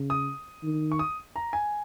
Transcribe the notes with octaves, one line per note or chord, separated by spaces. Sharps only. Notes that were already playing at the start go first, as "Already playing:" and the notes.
Already playing: C#3
D#6
D#3
C#6
D#6
A#5
G#5